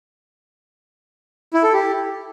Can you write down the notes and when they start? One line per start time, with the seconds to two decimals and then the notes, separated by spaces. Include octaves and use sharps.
1.54 E4
1.63 A4
1.73 G4